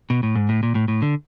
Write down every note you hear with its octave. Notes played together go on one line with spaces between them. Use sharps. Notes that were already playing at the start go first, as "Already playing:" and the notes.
B2
A2
G#2
A2
A#2
A2
A2
D3